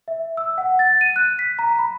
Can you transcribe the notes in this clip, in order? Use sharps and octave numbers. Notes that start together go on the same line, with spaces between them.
E5
E6
F#5
A6
D#7
F#6
B6
A#5
B5